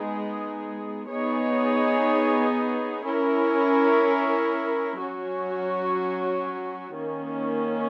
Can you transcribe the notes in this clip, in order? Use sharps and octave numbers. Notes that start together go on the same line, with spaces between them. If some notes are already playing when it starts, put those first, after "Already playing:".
Already playing: G#3 B3 D#4 G#4
B3 D#4 G#4 C#5
C#4 E4 A#4
F#3 C#4 F#4 C#5
D#3 A#3 C#4